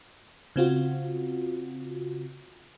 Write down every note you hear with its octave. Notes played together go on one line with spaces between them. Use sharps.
C#3 C4 F4 F#4